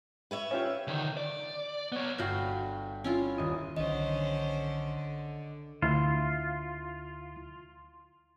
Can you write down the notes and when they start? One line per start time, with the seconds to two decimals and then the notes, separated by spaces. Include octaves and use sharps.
0.31 B4 C#5 E5
0.51 C#4 F4 G4
0.88 D3 D#3
1.17 D5
1.92 B3 C#5
2.18 G1 F#4 F5 G5 B5
3.04 C#4 E4 F4
3.38 D#1 D#5
3.77 B1 D3 D#3 C#4 C5 D#5
5.82 D2 E4 F4